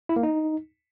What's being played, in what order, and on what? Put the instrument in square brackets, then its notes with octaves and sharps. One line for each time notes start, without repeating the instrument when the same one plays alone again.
[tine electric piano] E4
A#3
D#4